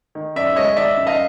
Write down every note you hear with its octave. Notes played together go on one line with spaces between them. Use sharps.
D#3
F#2 D5 E5
G#3 C#5 D#5
D#3 D5 E5
F#2
D#5 F5